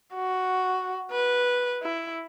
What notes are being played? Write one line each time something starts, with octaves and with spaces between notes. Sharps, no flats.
F#4
B4
E4